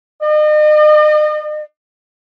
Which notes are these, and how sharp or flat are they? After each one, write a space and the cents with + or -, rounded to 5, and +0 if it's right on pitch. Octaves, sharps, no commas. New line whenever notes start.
D#5 -40